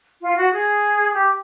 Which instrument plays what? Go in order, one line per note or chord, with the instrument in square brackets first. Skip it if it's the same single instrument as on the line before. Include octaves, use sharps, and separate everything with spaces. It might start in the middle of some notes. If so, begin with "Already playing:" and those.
[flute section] F4
F#4
G#4
G4